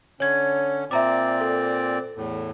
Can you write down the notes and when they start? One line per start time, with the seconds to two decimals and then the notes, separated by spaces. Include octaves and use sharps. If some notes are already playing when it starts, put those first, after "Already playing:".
0.20 D3 C#4 C#5 G#6
0.91 A#2 C4 D5 E5 A#5 D6
1.41 A4
2.16 E2 A2